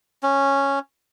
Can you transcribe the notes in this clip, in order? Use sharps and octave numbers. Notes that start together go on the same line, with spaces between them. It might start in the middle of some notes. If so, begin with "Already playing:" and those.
C#4